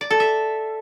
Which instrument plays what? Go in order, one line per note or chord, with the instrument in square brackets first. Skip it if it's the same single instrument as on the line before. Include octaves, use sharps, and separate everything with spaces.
[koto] D5
A4
E5